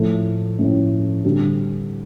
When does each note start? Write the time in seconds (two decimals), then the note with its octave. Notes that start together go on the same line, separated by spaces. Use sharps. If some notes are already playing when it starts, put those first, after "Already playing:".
Already playing: A2 F3 A3
0.59 A2 F3 A3
1.24 D3 G3 C4